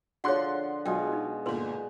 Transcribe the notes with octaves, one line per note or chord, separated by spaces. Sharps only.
D3 F3 F#4 G#4 C#5 F#5 C6 F#6
B2 F#3 G#3 F4 G5
D#4
G1 A#2 B4 C6